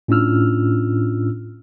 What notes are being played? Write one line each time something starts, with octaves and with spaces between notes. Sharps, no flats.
A2 C#4 D4 F4 E6 F6